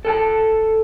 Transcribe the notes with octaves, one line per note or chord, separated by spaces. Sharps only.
A4 G5 A5